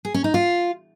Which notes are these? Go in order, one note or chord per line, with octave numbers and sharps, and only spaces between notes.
G#4
C#4
D#4
F4